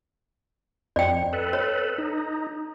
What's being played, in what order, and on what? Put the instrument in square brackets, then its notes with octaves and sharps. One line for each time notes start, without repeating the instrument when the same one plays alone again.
[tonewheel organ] F2 [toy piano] D5 G5
[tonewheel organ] A4 B4
[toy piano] C#5
[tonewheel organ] D#4